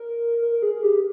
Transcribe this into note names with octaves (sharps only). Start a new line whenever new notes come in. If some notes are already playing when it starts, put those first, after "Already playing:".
Already playing: A#4
A#4
G#4
G4